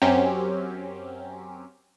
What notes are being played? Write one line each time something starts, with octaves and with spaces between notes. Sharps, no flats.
F#2 F#3 C4 C#4 G4